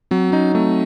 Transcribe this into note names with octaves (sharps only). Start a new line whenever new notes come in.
F#3 C4
C#4 D#4
A3 C4